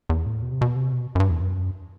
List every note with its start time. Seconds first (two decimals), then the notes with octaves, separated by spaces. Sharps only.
0.09 E2
0.26 A2
0.42 B2
0.52 C3
0.61 B2
0.76 C3
0.92 B2
1.15 F#2
1.20 G2
1.30 E2
1.42 F#2